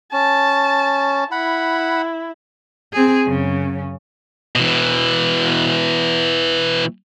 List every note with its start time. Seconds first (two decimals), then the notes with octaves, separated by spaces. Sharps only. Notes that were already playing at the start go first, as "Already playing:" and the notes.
0.13 C#4 A5
1.32 E4 F#5 B5
2.93 C4 G#4
3.26 F#2 C#3
4.55 B2 E3